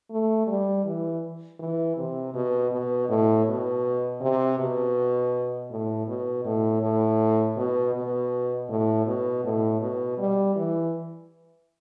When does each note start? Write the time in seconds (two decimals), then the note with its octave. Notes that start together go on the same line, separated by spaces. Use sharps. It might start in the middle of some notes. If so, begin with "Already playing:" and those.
0.10 A3
0.47 G3
0.85 E3
1.60 E3
1.97 C3
2.34 B2
2.72 B2
3.09 A2
3.46 B2
4.21 C3
4.58 B2
5.70 A2
6.07 B2
6.45 A2
6.82 A2
7.57 B2
7.94 B2
8.69 A2
9.06 B2
9.44 A2
9.81 B2
10.18 G3
10.56 E3